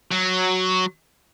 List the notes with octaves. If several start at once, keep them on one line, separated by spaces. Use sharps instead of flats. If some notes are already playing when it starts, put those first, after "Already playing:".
F#3